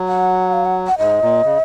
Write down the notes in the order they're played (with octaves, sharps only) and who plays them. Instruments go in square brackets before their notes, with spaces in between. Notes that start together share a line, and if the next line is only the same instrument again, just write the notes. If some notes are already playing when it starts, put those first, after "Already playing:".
Already playing: [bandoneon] F#3
[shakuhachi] F#5
F5
F#5
F#5
[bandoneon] G#2 [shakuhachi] D#5
[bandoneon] A#2
C#3